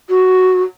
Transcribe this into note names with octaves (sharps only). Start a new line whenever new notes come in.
F#4